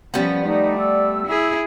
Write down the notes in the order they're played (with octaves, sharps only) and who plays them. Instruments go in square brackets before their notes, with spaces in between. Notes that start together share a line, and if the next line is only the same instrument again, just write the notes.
[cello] F3 C#4 [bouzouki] G3 B3
[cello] A3 [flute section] D#4 [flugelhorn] D5
[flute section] E6
[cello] E4 G#4